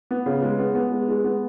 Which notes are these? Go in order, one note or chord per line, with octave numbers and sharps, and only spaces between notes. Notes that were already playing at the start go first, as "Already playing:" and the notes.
B3
C#3
G#3
B3
B3
G#3
G#3
B3